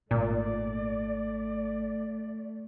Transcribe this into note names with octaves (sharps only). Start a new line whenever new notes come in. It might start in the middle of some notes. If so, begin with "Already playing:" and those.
G#1 A#2 A3 D5